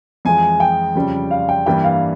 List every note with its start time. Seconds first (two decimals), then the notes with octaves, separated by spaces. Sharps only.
0.25 F2 E3 G#3 G#5
0.60 G5
0.95 F2 C#3 G3 C#4
1.31 F5
1.49 G5
1.66 G2 E3 G3 A#3 G5
1.84 F5